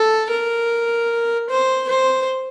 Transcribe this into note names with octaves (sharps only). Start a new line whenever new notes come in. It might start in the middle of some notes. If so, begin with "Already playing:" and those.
Already playing: A4
A#4
C5
C5